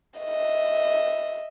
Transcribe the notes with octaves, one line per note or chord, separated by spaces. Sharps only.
D#5 E5